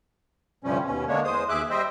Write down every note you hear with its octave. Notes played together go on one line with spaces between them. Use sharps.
D2 G2 C3 F3 G3 C#4
D#2 B2 C#4
D3 G#3 A#3 D4 C#5
E2 G#3 C5 D#6
D#2 G#4 E5 D6 F#6
G3 C5 D#5 E5 G5